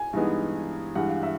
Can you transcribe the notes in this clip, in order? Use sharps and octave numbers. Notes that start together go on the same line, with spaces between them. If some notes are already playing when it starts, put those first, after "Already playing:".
Already playing: G#5
G2 E3 G#3 B3 D#4
G2 E3 G#3 F#5
F5
E5